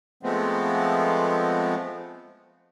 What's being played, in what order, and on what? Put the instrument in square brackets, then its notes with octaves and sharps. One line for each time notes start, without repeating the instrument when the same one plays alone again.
[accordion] F3 G#3 A3 B3 C4